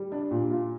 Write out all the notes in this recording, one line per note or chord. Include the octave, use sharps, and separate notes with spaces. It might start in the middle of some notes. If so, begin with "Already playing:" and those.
Already playing: G3
D4
A#2
F4